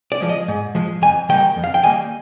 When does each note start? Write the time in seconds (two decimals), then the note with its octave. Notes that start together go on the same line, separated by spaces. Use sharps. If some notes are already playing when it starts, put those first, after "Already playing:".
0.12 D5
0.20 F3 G#3
0.29 D#5
0.48 G#2
0.75 F3 G#3
1.02 F2 G#5
1.29 D#3 G3 A#3 G5
1.56 F2
1.64 F5
1.74 G5
1.83 D#3 G3 A#3 G#5